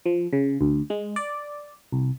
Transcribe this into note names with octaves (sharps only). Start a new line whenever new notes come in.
F3
C#3
D2
G#3
D5
C2